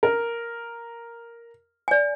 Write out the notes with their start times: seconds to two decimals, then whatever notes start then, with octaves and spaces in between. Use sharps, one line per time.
0.03 A#4
1.88 D5 G#5